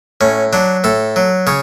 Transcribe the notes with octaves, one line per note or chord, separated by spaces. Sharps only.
A2 C#4
F#3 D4
A2 A4
F#3
C#3 C#5